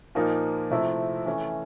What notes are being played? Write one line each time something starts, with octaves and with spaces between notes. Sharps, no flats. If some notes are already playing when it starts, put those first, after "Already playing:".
A#2 F3 A#3 D#4
C3 F3 A3 C4 E4
E3 A3 C#4